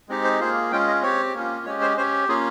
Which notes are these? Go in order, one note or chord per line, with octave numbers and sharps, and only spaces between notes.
G#3 C4 D#4 G4
C5
A#3 F4 G#4 C5
G#3 C#4 F4 G5
D#5
C4 G4 C#5
A#3 C#4 F4
G#3 C#4 G4 C#5
C5
C#4 G4 C5
A#3 C#4 F4 G#4